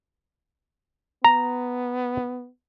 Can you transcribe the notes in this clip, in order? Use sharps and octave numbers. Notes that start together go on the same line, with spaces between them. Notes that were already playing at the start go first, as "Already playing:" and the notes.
B3 A#5